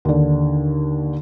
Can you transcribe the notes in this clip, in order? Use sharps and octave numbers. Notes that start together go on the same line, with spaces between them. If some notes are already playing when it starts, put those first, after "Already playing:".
D#2 D3